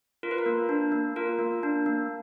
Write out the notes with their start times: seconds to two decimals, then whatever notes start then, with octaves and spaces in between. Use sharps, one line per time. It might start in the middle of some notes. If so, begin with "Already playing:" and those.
0.23 F4 A#4
0.31 B4
0.38 A#4
0.46 A#3
0.69 D4
0.92 A#3
1.16 F4 A#4
1.39 A#3
1.63 D4
1.86 A#3